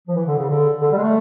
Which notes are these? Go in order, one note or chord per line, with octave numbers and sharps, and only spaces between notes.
F3
E3
D3
C#3
D3
D3
G3
G#3
A3